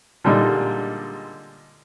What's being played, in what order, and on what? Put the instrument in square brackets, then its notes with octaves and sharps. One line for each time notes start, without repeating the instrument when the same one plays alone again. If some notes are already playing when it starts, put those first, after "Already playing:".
[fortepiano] A#2 D3 G3 G#3 D#4